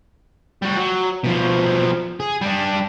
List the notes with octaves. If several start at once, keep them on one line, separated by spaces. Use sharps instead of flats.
G3 F#4
F#3
B2 F3
G#4
G3 D4